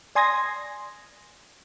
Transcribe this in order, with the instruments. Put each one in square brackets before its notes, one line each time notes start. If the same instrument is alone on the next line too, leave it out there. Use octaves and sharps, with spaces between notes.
[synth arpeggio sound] D5 G#5 C6 D#6 G#6 A#6